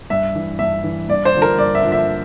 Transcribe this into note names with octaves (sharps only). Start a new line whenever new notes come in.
G2 E5
E3
G2 E5
E3
G2 D5
C5
D3 F3
A#4
G2 D5
E5
D3 F3
E5